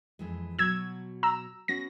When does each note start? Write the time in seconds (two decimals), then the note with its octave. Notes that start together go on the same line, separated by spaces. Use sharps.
0.19 F2 E3 G#3
0.59 B2 F#3 E6 G#6
1.23 A#5 E6
1.68 B3 C#4 F#4 A#6